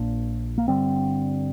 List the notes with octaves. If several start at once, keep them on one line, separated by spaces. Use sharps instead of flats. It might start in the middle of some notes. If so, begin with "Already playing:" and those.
Already playing: A#1 A#2 A#3 D4
A#3
G1 G2 D3 G3 C4